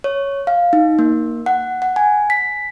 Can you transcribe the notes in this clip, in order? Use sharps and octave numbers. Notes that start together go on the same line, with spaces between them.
C#5
F5
D#4
A#3
F#5
F#5
G#5
B6